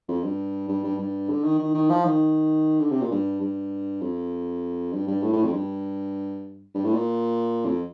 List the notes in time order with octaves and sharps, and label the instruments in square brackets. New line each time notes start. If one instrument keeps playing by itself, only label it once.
[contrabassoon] F2
G2
G2
G2
G2
D3
D#3
D#3
D#3
F3
D#3
D3
C3
A#2
G2
G2
F2
G2
G2
A2
A2
F2
G2
G2
A2
A#2
F2